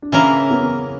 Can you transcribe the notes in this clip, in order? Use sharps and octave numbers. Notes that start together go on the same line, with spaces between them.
D4
C#3 E3 A#3 C#4 E4 A#4
B3